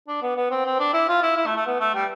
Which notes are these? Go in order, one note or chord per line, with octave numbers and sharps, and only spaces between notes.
D4
B3
B3
C4
C4
D4
E4
F4
E4
E4
A3
A3
B3
A3
G3